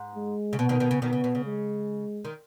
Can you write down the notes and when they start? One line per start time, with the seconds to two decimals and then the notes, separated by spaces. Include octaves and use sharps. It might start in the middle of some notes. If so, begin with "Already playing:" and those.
Already playing: G#2
0.15 G#3
0.53 C#3
0.59 B2 B3
0.69 B2 D#3
0.80 B2 D#3
0.91 C#3
1.01 B2 D#3 B3
1.13 C#3
1.24 B2
1.35 C#3
1.45 G#3
2.25 D#3